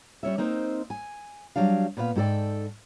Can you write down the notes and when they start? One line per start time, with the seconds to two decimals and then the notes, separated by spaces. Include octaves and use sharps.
0.23 G3 C#4 C#5 E5
0.38 A#3 C4 D#4 C5
0.90 G#5
1.56 F#3 G3 D4 F5
1.97 A#2 B3 B4 C#5 F5
2.16 G#2 F#4 A4 D5 G5